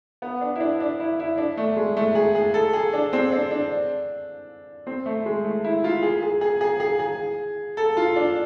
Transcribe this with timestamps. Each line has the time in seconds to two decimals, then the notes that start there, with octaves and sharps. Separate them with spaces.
0.22 B3
0.41 D4
0.56 E4
0.60 D4
0.80 D4
1.00 E4
1.20 E4
1.38 D4
1.57 A3
1.76 G#3
1.97 A3
2.15 G#4
2.35 G#4
2.54 A4
2.73 G#4
2.93 D4
3.13 C4
3.32 D4
3.51 D4
4.87 C4
5.06 A3
5.26 G#3
5.44 A3
5.64 E4
5.84 F4
6.02 G#4
6.22 G#4
6.41 G#4
6.61 G#4
6.80 G#4
6.99 G#4
7.77 A4
7.97 F4
8.16 D4